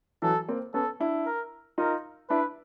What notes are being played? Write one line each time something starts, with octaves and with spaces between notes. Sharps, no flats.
E3 F#3 A4
A#3 C4
B3 C#4 A4
D4 E4
A#4
D#4 F4 A#4
D4 E4 B4